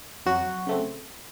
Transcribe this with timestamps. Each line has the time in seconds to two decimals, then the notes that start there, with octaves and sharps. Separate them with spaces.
0.26 F2 F#3 F#4
0.67 C#3 A3 C4